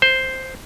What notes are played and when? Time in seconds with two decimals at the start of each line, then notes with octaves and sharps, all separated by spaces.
0.02 C5